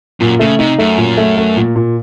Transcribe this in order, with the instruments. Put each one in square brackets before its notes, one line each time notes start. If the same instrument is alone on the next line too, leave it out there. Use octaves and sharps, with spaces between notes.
[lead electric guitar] F#2 [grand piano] A#2
[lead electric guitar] C#3 [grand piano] A3
[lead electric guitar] C3 [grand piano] D#4
[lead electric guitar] F#2 [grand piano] A3
[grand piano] A#2
A3
A3
A#2
A#2